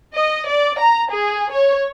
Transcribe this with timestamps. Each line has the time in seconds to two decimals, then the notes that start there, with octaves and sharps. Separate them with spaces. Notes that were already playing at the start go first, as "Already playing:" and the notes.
0.15 D#5
0.49 D5
0.79 A#5
1.10 G#4
1.51 C#5